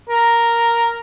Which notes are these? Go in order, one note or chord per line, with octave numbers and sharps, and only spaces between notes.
A#4